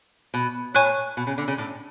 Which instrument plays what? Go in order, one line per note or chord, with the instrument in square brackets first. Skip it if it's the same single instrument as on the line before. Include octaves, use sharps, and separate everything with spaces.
[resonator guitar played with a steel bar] B2
[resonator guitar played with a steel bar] A2 [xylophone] C#5 G#5 C#6 F#6
[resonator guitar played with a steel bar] B2
C#3
D3
C#3
A2